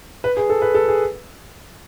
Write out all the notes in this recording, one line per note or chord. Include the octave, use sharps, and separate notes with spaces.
B4
G#4
A4
B4
A4
G#4